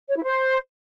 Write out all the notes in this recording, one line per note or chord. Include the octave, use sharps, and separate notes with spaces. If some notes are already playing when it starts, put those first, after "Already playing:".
C#5
E4
C5